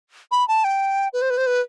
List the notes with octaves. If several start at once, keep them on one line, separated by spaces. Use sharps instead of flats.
B5
A5
G5
B4
C5
B4
C5
B4